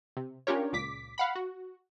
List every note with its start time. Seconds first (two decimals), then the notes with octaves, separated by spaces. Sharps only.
0.17 C3
0.47 C#4 D4 F4 G4 A#4 C#5
0.73 C#2 A#2 D6 B6
1.18 F5 F#5 B5
1.35 F#4